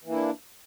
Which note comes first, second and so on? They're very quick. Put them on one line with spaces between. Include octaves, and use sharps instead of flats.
E3 A#3 E4 D4